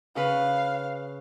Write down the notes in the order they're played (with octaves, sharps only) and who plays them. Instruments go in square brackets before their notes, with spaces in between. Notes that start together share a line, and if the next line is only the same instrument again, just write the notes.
[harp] C#3 B4 [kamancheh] F5